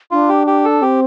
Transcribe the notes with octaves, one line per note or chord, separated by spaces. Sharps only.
D4 F4
G4
G4
A4
C4 G4